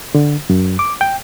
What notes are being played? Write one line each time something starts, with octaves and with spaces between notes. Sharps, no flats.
D3
F#2
D6
G5